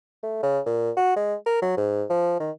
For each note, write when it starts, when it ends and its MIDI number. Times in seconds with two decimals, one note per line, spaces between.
0.23 0.41 57
0.43 0.60 49
0.66 0.91 46
0.97 1.15 66
1.16 1.35 56
1.46 1.62 70
1.62 1.75 54
1.77 2.05 44
2.10 2.36 53
2.40 2.51 51